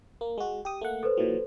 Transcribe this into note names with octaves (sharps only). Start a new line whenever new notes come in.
A#3
G#3 F#4
G4 D#6
A3 A#3 F#5
A4 B4 C5
A#2 E3 F#3